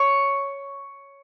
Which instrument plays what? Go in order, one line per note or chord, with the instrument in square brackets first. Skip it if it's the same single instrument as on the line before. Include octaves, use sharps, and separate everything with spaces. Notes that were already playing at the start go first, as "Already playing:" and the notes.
Already playing: [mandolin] C#5